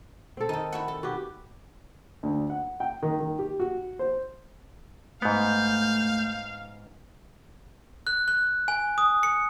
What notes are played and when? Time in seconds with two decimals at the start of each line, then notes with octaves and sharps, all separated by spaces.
0.37 C4 A4
0.49 D#3 D#4 A4
0.72 E4 F#4 F#5
0.88 A4
1.03 B3 F#4 G4
2.23 D2
2.50 F#5
2.80 G5
3.03 D#3
3.20 D#3
3.39 G4
3.60 F#4
3.99 C5
5.22 G#2 A3 B3 F5 G6
8.07 F#6
8.28 F#6
8.68 G#5
8.98 D#6
9.23 C#7